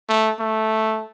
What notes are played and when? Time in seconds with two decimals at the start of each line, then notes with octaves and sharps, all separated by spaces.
0.09 A3
0.39 A3